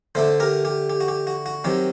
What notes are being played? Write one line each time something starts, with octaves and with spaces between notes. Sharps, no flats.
D3 A3 D4 A4 C5
G4 A#4
G4
G4
F#4
G4
F#4
F#4
D#3 F#3 C4 G4